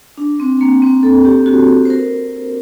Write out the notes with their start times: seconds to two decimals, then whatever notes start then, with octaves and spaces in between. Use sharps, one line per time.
0.17 D4
0.40 C4
0.61 A#3
0.82 C4
1.03 A4
1.25 G4
1.46 F#4
1.85 C5
1.90 A#4